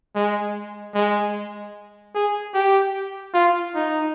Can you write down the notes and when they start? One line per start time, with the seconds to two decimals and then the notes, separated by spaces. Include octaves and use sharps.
0.15 G#3
0.94 G#3
2.15 G#4
2.54 G4
3.34 F4
3.75 D#4